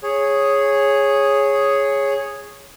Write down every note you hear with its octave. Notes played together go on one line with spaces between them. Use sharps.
G#4 C#5